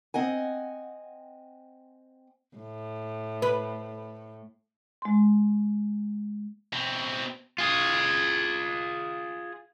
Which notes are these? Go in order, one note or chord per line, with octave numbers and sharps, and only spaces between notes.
C4 D#5 F#5 G#5
A2
B4
G#3 C6
B2 C4
F4 G#4